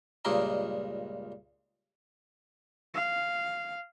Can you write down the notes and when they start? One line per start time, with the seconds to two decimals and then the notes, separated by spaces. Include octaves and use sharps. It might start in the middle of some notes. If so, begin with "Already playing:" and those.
0.25 C#2 G2 A#2 A#3 D#4 C6
2.94 F5